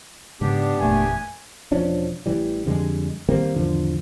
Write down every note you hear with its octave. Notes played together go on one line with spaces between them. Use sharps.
G#2 C#3 G#3 B3 D4 G4
F#1 E2 A#2 A3 G#5
E1 F3 C#4 D4
A1 E3 G3
F2 D3 G3 G#3
D#3 G3 A#3 C4
G#1 E2 D3 F3